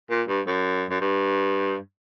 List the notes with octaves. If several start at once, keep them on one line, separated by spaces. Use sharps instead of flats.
A#2
G2
F#2
F#2
G2